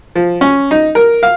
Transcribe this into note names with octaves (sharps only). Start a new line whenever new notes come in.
F3
C#4
D#4
A#4
F5